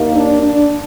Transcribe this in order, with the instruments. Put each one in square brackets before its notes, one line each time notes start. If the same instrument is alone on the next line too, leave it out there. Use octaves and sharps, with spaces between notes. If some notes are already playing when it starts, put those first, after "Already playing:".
Already playing: [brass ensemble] D#2 D#3 A#3
[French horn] D4
D4